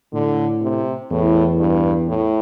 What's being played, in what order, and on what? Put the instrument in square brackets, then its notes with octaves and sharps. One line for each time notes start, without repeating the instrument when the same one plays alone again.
[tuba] A2 [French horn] D3
[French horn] C3
[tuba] E2 [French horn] A2
[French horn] G2
A2